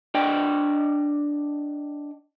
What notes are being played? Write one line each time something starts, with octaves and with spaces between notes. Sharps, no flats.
D4 D5 D#5 G5